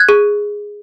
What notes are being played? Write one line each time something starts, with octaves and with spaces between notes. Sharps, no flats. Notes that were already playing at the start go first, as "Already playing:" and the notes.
Already playing: F#6 G#6
G#4